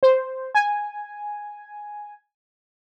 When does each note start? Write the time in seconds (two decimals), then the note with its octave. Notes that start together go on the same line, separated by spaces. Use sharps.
0.03 C5
0.55 G#5